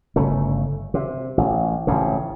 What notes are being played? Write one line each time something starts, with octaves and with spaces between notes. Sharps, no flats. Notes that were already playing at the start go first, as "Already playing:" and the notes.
G1 C#3 A3
C3
A1
A1 F2 C#3